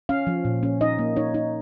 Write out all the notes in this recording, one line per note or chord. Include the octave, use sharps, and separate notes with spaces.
C#4 F5
F3
A#2
C#4
D#4 D#5
A#3
D#4 C#5
D#4